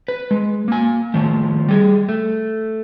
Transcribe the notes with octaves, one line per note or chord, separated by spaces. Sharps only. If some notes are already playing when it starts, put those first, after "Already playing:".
B4
G#3
A#3 G#5
D#3 F3 A3
G3 G#4
A3